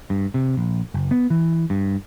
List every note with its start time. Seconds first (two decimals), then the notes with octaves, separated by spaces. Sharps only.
0.10 G2
0.34 C3
0.57 A#1
0.94 F#1
1.11 B3
1.30 E3
1.70 G2